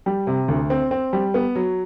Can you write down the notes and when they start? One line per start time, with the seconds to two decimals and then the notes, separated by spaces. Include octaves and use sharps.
0.06 G3
0.27 C3
0.48 D2
0.70 C4
0.91 C4
1.13 G3
1.34 B3
1.55 F#3